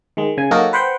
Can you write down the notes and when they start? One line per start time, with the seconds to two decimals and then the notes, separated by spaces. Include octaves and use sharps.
0.17 D#3 G#3
0.37 C#3 G#5
0.51 F#3 A#3 D#4 F#4 A4 A#4
0.73 B4 C5 F#5 G5